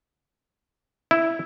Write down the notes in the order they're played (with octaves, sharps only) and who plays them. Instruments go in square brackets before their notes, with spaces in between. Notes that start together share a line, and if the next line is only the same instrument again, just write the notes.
[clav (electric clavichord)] E4